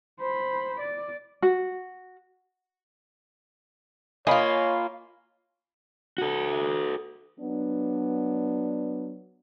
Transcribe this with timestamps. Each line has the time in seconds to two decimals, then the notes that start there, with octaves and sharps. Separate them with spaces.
0.20 C5 B5
0.80 D5
1.42 F#4
4.27 A#3 F4 C#5 D#5 G#5 B5
6.18 F#4 A4
7.40 F#3 B3 D4